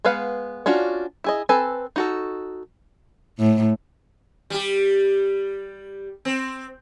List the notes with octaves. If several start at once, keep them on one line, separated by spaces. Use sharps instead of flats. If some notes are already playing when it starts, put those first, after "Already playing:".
G#3 B3 B4 F5 F#5
C#4 D4 F4 F#4
E4 G#4 D#5
C4 A4 B4 G#5 A5
D#4 F#4 A4
A2
G3 G4
C4